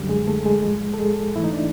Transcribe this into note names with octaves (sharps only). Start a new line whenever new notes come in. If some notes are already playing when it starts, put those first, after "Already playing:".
Already playing: F#2 D3 G3
G#3 G#4
A3 A4
G#3 G#4
A2 F3 G#3
A4
G#3 G#4
G#2 E3 A3 E4
D#4
D4